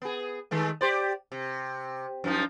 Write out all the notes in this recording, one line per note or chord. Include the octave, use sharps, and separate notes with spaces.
B3 G#4
D#3 G#3 A3
G4 C5 D5
C3
F#2 F3 D#4